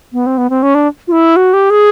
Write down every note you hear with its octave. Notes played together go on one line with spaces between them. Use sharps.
B3
C4
B3
C4
C#4
D4
F4
E4
F#4
G4
G#4